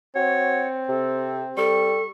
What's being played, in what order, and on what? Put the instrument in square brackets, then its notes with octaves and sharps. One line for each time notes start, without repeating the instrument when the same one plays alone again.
[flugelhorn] C4 [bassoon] F#4 [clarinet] C#5
[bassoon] C3 [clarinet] A4
[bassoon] G3 [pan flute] A4 [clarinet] C#6